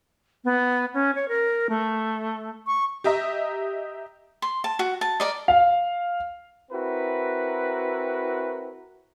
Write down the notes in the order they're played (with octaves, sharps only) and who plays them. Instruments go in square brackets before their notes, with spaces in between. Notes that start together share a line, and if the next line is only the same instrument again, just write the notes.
[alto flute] B3
C#4
C#5
A#4
A3
C#6
[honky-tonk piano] G4 D#5 E5 A#5
[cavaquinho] C6
A5
F#4
A5
A#4 D5 D#5
[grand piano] F5
[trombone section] C4 E4 F#4 A#4 B4